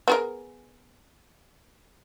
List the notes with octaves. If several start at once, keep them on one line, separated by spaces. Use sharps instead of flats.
B3 G#4 A#4